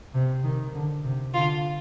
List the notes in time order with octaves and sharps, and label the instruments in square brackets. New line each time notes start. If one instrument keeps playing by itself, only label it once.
[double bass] C3
D#3
D3
C3
[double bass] D3 [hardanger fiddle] F4